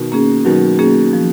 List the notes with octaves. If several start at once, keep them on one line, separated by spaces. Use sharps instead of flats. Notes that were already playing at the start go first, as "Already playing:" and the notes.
Already playing: B2 D#3
A#3 C#4 G#4
B2 D#3 F#3
A#3 C#4 G#4
F3